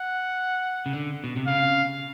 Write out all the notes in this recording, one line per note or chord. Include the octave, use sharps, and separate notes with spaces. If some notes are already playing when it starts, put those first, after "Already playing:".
Already playing: F#5
C#3
D3
B2
C3
C#3 F5